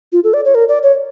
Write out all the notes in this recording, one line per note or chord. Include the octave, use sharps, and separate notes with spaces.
F4
A4
D5
C#5
A#4
D5
C#5